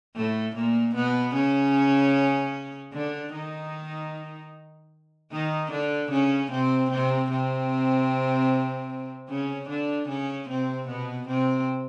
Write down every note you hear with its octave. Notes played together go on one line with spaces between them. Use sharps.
A2 A3
A#2 A#3
B2 B3
C#3 C#4
D3 D4
D#3 D#4
D#3 D#4
D3 D4
C#3 C#4
C3 C4
C3 C4
C3 C4
C#3 C#4
D3 D4
C#3 C#4
C3 C4
B2 B3
C3 C4